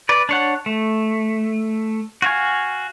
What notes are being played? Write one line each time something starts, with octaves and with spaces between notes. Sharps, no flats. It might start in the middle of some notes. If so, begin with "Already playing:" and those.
B4 D5
D4 C#5 F#5
A3
F#4 F5 G#5